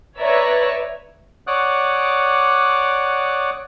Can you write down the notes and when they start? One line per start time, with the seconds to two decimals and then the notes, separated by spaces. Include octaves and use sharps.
0.20 B4 C#5 D5 E5 A#5
1.47 C#5 D5 F#5 D6 D#6 F#6